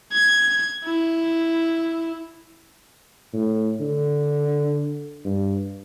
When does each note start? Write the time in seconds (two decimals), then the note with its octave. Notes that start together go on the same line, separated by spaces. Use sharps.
0.12 G#6
0.85 E4
3.33 A2
3.80 D3
5.25 G2